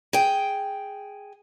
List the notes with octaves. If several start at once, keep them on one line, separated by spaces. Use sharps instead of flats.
G#4 G5